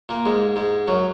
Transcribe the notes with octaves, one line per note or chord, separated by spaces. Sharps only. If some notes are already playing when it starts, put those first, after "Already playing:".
A#2 A#3
G#2 G#3
G#2 G#3
F#2 F#3